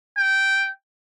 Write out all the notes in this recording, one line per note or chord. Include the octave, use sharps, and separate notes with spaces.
G5